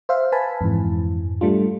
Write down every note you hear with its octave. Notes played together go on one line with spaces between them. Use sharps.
C5 E5 F5
B4 G#5 A5 B5
F2 G#2 E3
G3 A3 D4 F4